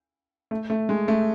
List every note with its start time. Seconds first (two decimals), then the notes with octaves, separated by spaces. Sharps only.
0.51 A3
0.70 A3
0.89 G#3
1.08 A3